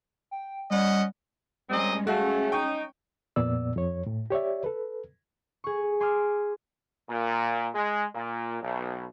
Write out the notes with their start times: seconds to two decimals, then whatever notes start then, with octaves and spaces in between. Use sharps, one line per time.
0.31 G5
0.71 G3 C#4 D#5 F#5
1.70 A#2 G3 G#3 C4 C#4 D#5
2.07 A3 C#4 F#4 G#4 F5
2.52 D#4 G5 C#6
3.36 F2 A#2 B3 D5 E6
3.75 F2 C#5
4.07 A2
4.30 G4 C#5 D5 E5
4.64 A4 B4
5.64 G#4 C#6
6.00 G#5 C6 D6 D#6 F6
7.10 A#2
7.75 G#3
8.14 A#2
8.61 B1